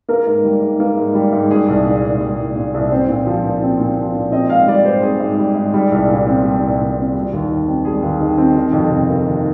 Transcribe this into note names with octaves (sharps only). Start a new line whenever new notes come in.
A#3 A#4
G#2
G3
G#2
A#3
G#2
G3
G#2
G3 G#4
C2
A#2
C2
G3
C2
A#2
C2
C4 C5
A#2
F3
A#2
C4
A#2
F3
A#2
C4 D#5
G#2 F5
G3 D5
G#2 C5
C4 G#4
G#2
G3
G#2
G3
C2
A#2
C4
G3
C2
A#2
C4
G3
D#2
D#3
C4
G3 G#4
D#2
D#3
C4
D#3
F2
C3
A#3
D#3